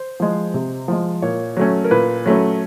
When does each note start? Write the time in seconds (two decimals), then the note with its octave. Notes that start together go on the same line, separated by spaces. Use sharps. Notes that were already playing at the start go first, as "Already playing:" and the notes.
Already playing: C5
0.20 F3 G#3
0.54 C3
0.88 F3 G#3
1.22 A#2 C#5
1.57 F#3 A3 C#4
1.84 A#4
1.91 A#2 B4
2.26 F#3 A3 C#4